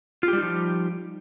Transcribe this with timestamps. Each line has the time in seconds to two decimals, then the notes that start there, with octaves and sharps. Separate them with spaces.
0.23 F4
0.28 G4
0.33 G3
0.38 D#4
0.43 F3